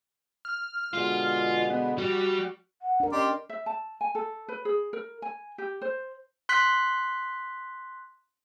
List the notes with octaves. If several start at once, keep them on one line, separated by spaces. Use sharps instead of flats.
F6
B2 D3 G#3 F4
B3
G3 F#4
F#5
D4 A#4
C#4 G4 D5 D#5 C6
E5
A5
G#5
A4
B4
G#4
A#4
G#5
G4
C5
C6 F#6 B6